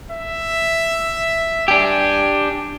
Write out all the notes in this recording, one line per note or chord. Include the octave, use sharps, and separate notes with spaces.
E5
D4 G4 G#5